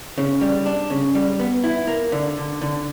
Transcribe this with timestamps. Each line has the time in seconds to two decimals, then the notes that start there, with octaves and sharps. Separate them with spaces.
0.18 C#3
0.41 G3
0.66 D4
0.90 C#3
1.15 G3
1.40 B3
1.64 E4
1.87 A#3
2.12 D3
2.37 D3
2.61 D3